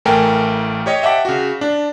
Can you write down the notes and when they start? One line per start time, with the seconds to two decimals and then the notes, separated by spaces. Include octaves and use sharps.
0.05 A1 A3 A#4 G5 G#5
0.86 G4 C#5 D#5
1.03 E5 F#5 G5 A5 D6 B6
1.25 C#3 F#4
1.61 D4